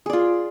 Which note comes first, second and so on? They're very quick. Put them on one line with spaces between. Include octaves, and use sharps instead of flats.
G#4 D5 F4